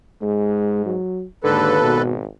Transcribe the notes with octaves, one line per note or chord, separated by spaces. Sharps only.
G#2 G#3
F#3
D#2 G#2 D3 A4 B4
G#1 B2